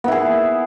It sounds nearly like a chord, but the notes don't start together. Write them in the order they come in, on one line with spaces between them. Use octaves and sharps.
B3 E4 G#4